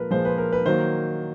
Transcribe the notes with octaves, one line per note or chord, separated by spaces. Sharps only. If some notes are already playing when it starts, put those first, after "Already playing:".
Already playing: A#2 F3 G#3 A#4 B4
A#2 F3 G#3 C5
B4
A#4
B4
D#3 F#3 A#3 C5